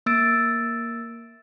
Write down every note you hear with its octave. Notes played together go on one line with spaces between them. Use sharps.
A#3 E6 A6 D7